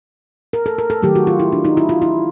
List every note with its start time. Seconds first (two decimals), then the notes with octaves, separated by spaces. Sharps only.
0.53 A#4
0.66 A4
0.78 A#4
0.90 A4
1.02 D#3 F#3 A3 G4
1.15 F#4
1.27 F4
1.40 E4
1.52 D4
1.65 D#4
1.77 E4
1.89 F4
2.02 E4